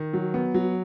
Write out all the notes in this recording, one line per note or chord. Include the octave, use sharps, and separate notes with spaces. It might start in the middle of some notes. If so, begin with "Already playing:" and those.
Already playing: D#3
F#3
B3
F#3